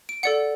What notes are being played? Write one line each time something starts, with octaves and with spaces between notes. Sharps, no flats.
D7
A4 D5 F#5 C#7